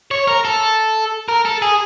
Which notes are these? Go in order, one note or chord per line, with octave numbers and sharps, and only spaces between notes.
C#5
A#4
A4
A#4
A4
G#4